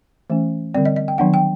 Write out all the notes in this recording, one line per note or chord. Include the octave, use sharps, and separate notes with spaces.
E3 A3 C#4
D3 G3 C4 D5
D#5
D#5
G5
D#3 F#3 B3 D4 F#5
G5